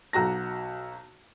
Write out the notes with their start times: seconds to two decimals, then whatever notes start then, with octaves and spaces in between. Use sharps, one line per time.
0.13 B1 F#4 A#5 A#6